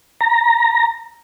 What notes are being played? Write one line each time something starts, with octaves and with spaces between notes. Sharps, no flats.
A#5